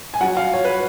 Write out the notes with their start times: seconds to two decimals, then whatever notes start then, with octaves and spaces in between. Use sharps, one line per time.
0.14 G#5
0.21 F#3 C#4 F4 F#5
0.37 F5
0.53 C#5
0.65 B4